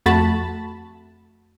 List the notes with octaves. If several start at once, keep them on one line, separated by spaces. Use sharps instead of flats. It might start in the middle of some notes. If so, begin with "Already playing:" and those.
F2 A3 F#4 A5 B5